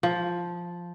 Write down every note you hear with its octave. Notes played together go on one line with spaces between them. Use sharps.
F3